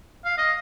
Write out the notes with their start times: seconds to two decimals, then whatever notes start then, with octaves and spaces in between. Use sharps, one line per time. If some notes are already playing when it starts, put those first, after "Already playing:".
0.25 F5
0.38 D#5